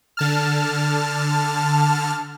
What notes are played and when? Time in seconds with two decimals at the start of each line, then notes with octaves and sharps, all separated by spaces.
0.17 D3 A5 F6